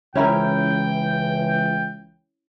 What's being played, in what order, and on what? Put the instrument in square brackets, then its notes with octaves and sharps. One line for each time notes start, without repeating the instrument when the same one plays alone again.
[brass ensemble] C#2 E3 [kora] C#4 E4 A#4 [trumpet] G5